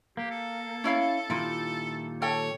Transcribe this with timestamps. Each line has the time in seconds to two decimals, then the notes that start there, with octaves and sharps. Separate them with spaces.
0.17 A#3 G4
0.31 A4
0.84 C#4 E4 F5
1.30 A#2 D#3 G3 E4 F4
2.22 A4 C#5 G5